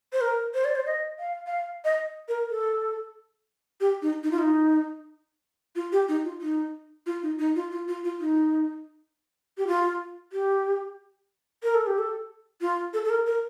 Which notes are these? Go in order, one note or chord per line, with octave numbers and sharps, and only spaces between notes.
C5
A#4
C5
D5
C5
D#5
F5
F5
D#5
A#4
A4
G4
D#4
D#4
F4
D#4
F4
G4
D#4
F4
D#4
F4
D#4
D#4
F4
F4
F4
F4
D#4
G4
F4
G4
A#4
A4
G4
A4
F4
A4
A4
A#4
A#4